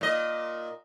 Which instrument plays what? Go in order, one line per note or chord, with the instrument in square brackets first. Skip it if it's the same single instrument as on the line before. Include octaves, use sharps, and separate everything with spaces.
[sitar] A#2 D#5